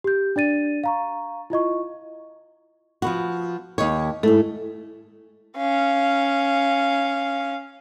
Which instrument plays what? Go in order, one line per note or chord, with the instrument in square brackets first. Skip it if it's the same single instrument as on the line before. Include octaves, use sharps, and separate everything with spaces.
[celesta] G4 G6
D4 D5 A6 D#7
F5 A#5 C#6
E4 F4 D#5 C#6
[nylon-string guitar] F3 B3 F#4
D#2 D#4 C#5
[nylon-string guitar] G#2 A3 [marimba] E4 A4
[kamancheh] C#4 F5